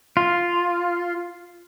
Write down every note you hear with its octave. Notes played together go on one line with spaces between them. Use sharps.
F4